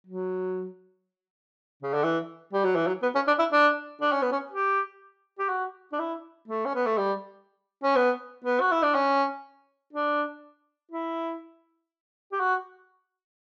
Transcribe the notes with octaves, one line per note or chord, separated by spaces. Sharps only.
F#3
C#3
D3
E3
G3
F#3
E3
F#3
B3
C#4
D4
E4
D4
D4
C#4
B3
C#4
G4
G4
F#4
D4
E4
A3
C#4
B3
A3
G3
C#4
B3
B3
F#4
E4
D4
C#4
D4
E4
G4
F#4